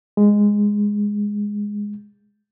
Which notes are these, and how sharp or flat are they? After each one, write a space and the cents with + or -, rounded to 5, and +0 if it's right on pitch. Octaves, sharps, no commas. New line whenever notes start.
G#3 -10